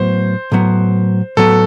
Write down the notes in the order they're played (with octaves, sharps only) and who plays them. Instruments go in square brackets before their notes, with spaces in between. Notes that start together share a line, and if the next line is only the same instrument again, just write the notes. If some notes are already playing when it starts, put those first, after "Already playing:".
Already playing: [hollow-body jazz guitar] A2 F#3 B3 [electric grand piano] C5
[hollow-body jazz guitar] A2 F#3 B3
[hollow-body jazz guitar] A2 F#3 B3 [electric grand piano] A4